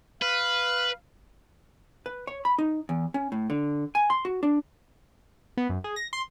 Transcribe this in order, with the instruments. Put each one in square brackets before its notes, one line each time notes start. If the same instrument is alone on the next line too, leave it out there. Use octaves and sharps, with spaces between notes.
[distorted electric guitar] B4 [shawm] F5
[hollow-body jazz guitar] B4
C#5
B5
D#4
E2
C#4
A2
D3
G#5
C6
F#4
D4
[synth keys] B3
F#2
G#4
A#6
C6